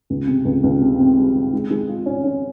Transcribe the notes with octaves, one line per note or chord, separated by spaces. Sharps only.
C#2
C3
C#2
C#2
C3
C4
G3
G3
G#3
G#3
F4
C#4
C#4